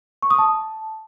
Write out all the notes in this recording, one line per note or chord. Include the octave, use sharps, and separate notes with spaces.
C#6
D#6
A5